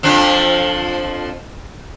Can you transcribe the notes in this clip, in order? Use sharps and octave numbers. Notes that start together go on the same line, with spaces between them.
F2 F3 D4